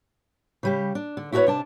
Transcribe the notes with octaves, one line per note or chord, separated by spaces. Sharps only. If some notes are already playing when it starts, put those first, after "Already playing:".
C#3 G3 G4
D4
D3
E4 F#4 G#4 A#4 B4 C#5
C3 D4 A5